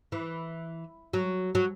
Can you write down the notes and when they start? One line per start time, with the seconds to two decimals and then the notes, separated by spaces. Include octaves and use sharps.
0.12 E3
1.13 F#3
1.55 F#3